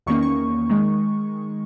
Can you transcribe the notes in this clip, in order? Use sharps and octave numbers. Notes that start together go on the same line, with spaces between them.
E2 D#3 A#3 C#4 C#6
C#6
D#3 G#3